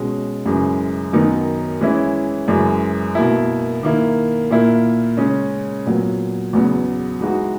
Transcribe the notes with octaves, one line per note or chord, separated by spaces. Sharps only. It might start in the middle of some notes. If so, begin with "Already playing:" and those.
Already playing: B2 G#3 C#4
F#2 C#3 E3 G#3
F#2 D#3 F#3 B3 D#4
E3 G#3 C#4 E4
F#2 C#3 E3 G#3
B2 A#3 E4
D#3 A#3 E4
A#2 A#3 E4
C#3 G#3 C#4
A#2 F#3 B3
E2 C#3 F#3 B3
E3 G#3 D#4 F#4